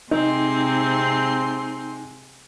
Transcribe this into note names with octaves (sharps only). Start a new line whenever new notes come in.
C3 G#3 C4 D#4 C6